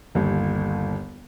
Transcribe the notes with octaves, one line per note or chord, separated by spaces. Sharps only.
G1 D#2